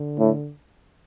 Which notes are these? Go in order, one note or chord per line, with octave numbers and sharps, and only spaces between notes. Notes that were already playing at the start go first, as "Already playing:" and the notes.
Already playing: D3
A2